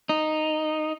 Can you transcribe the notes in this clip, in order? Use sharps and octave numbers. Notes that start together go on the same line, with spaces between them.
D#4